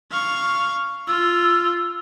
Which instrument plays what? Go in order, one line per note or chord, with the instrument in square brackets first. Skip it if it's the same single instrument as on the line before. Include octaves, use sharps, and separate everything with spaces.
[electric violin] F5 C#6
[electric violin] F4 [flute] E6